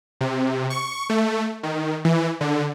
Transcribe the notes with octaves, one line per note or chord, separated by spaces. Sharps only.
C3
C#6
A3
D#3
E3
D3